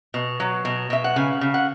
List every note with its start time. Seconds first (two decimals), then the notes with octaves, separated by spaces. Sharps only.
0.14 B2
0.40 F#3
0.65 B2
0.90 B2 E5
1.04 F#5
1.16 C#3 G#5
1.41 C#3
1.54 F#5